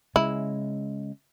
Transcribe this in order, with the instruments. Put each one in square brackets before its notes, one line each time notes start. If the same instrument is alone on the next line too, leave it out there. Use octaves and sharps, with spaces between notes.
[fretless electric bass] C#3 G#3 [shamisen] E4